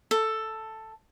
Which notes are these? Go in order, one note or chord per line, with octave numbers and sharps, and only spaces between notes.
A4